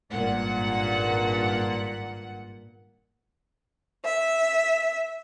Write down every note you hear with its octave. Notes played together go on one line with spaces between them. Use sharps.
G#1 G2 A#2 F#5
E5